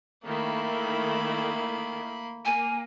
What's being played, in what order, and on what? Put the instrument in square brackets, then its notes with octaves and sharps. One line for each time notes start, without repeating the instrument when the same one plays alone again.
[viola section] D#3 A3 E4 [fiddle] A#3 B5
[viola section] A#3 [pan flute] G#5